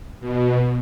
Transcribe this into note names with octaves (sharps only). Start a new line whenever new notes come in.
B2